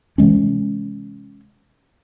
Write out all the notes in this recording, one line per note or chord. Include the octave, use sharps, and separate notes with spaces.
C3 E3 G#3 C#4